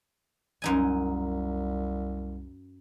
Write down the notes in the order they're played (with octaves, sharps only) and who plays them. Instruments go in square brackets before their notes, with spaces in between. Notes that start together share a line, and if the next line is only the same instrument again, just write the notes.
[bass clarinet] C2 [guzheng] F#2 D#4 G#5